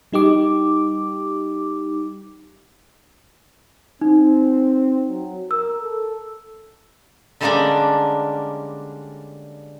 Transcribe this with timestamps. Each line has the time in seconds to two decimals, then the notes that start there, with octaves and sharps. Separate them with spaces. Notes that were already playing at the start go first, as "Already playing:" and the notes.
0.12 G3 D#4 G4 D6
4.01 C4 D#4
5.09 F#3
5.51 A#4 E6
5.83 A4
7.41 D3 G3 G#3 A#3 C#4 D4